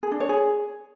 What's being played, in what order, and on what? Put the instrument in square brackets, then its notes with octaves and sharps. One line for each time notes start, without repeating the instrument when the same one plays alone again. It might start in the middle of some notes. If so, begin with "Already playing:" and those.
[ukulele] G#4
D4
C#5
G#4